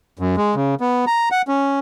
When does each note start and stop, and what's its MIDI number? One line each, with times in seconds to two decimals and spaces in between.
0.19 0.36 42
0.37 0.55 56
0.55 0.75 49
0.81 1.05 59
1.07 1.29 82
1.32 1.42 78
1.48 1.79 61